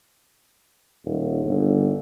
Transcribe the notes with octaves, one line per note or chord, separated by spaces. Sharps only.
D#1
G1